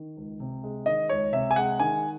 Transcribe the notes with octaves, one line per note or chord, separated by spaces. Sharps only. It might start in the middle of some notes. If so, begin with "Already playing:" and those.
Already playing: D#3
C#2
C3
G#3
D#3 D#5
C#2 C#5
C3 E5
G#5
G#3 F#5
D#3 G#5